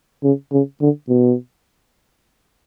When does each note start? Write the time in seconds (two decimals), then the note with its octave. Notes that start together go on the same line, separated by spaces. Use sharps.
0.24 C#3
0.52 C#3
0.81 D3
1.09 B2